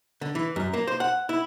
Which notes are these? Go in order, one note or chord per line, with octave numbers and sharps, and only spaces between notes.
D3
E3
F#2
A#3
C5
F#5
E4